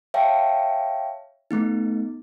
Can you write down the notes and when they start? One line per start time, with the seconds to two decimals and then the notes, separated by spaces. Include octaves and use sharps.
0.14 C#5 E5 F5 G5 A5
1.51 A3 B3 D#4